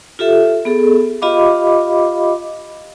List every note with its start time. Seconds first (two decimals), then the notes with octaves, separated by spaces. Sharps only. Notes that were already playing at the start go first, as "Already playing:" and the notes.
0.19 F4 G4 A4 E5
0.65 B3 G#4 A4
1.22 F4 G4 D#5 F5 B5 D6